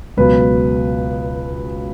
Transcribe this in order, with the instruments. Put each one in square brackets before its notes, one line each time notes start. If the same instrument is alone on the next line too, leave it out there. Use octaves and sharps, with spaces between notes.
[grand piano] C#2 B2 F#3 B4